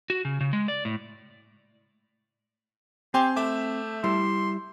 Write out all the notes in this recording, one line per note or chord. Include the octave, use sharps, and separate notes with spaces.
F#4
C#3
C#3
G#3
D5
A2
C4 G4 G#5 C6 G6
A3 E5 D6
G3 E4 C6